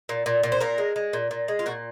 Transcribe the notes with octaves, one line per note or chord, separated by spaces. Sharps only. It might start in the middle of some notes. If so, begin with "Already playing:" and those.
A#2
A#2
A#2
C5
A#2 A#4
G#3
G#3
A#2
A#2
G#3
F4
A#2 F#4